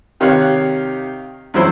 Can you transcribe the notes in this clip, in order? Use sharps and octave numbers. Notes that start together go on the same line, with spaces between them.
C3 D#3 G4 C#5 F5 F#6
E2 G2 C#3 F#3 E4 C5